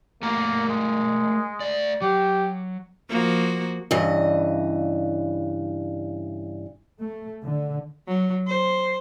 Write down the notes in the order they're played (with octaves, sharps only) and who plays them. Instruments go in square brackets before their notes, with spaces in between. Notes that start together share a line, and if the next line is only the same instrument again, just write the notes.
[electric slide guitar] A3 F#4 A#4 [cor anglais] A#3
[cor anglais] G#3
[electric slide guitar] A3 D5
[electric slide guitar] F#3 [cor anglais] G4
[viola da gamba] F3 A#3 F#4
[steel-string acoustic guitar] G2 C#3 E3 D#5
[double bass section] A3
D3
[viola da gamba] F#3
C5